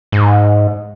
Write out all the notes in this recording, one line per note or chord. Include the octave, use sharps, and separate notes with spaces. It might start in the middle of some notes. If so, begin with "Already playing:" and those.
G#2